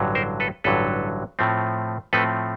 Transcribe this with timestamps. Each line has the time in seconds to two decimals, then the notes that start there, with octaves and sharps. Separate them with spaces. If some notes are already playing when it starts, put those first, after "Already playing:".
Already playing: A1 G2 D3 F#3
0.15 A#4 C5
0.40 A4 B4
0.64 A1 G2 D3 F#3 A4 B4
1.39 A2 F3 A3 C4
2.13 A2 F3 A3 C4 A4 B4